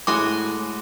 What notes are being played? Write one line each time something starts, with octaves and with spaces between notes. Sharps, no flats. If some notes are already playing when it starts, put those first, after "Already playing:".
A2 G#3 F#4 G#5 D6